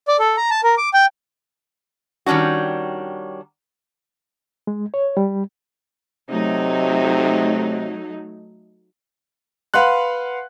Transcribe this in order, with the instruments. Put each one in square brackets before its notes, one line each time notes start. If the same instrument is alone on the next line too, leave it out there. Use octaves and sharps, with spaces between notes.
[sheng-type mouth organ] D5
A4
A#5
A5
A#4
D6
G5
[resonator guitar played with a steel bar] D#3 G3 C#4 D4 F#4
[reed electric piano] G#3
C#5
G3
[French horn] C3 [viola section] F#3 A3 D#4
[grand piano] B4 F5 F#5 C6 F#6